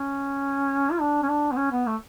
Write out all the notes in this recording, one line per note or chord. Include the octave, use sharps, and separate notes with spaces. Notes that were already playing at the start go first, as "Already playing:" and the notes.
Already playing: C#4
F4
D4
C#4
D4
B3
C#4
B3
A3